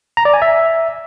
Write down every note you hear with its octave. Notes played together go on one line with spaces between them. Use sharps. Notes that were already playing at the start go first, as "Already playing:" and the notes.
A#5
D5
G#5
E5